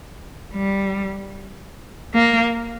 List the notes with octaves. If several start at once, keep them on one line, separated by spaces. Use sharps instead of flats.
G3
A#3